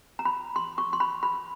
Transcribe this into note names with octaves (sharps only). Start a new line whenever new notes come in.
A#5
B5
C6
C#6
C6
B5
B5